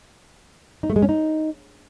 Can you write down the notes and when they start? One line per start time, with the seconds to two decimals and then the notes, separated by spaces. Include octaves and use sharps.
0.83 D#4
0.90 A3
0.96 G#3
1.02 C#4
1.09 D#4